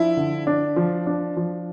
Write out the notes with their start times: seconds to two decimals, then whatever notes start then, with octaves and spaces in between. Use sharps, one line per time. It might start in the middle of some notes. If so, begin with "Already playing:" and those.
Already playing: F3 D4 E4
0.17 D3
0.47 D4
0.76 F3
1.07 D4
1.37 F3